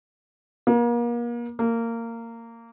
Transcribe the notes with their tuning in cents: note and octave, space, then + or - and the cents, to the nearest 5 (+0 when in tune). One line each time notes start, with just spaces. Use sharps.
A#3 +35
A#3 -20